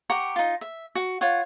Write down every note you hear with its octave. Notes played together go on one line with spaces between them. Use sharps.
G4 F#5 A#5 C#6
D#4 F4
E5
F#4
F4 C#5 F#5